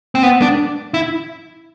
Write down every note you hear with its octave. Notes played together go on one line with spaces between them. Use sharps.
C4
B3
D4
E4